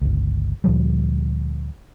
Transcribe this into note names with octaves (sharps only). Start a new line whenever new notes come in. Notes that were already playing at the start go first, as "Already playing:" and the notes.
G1 C#2
D2 A#2 F3 G3